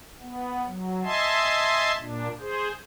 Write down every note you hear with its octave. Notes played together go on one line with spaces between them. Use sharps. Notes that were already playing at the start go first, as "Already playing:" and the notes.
B3
F#3
D#5 E5 G#5 A5 C6
A#2 D4
G#4 C5